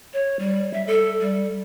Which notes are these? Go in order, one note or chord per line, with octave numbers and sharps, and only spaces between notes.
C#5
G3
E5
A4
G3